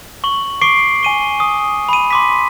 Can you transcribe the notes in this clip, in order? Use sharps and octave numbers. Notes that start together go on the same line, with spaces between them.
C#6 F#7
C#6 D6 C7 D7
G#5 D#7 G7
D#6
B5 D#7
C6 D6 B6